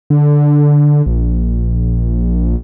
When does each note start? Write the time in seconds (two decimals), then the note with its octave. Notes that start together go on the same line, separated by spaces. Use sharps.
0.10 D3
1.06 A#1